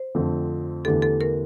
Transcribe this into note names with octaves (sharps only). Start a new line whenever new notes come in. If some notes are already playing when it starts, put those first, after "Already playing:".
Already playing: C5
F2 D3 F3 A3 C4
E2 D3 A3 E4 G4 A4
A4
A#4